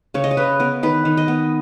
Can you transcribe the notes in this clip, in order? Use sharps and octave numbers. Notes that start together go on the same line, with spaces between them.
C#3 C#5
D#5
C#5
C#3 B4
B3 A#4
D#3 B4
D#3
D#5
B3